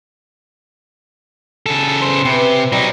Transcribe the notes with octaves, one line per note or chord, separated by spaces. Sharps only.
C#3 A4
C5
C3 B4 B5
F#3 G3 D#4